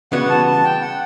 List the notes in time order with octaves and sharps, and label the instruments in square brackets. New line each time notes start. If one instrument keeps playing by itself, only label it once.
[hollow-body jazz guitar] C#3 E3 G3 B3 F#4 [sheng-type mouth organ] F#5
[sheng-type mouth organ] A5
A5
G5
F#5